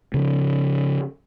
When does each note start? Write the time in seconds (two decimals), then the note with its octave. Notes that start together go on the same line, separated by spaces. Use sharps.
0.14 C#3 F3